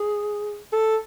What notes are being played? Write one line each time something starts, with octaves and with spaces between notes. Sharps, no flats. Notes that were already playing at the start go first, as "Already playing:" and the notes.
Already playing: G#4
A4